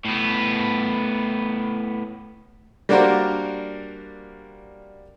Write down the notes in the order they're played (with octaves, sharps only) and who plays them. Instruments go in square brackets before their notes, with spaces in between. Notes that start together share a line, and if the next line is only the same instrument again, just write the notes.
[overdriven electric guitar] A2 B3
[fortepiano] G3 A#3 D4 F#4 A#4 C5